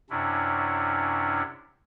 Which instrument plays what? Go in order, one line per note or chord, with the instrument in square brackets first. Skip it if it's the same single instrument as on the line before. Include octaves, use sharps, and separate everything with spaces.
[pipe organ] F#2 C3 C#4 D4 E4